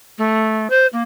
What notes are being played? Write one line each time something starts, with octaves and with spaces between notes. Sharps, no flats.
A3
C5
A#3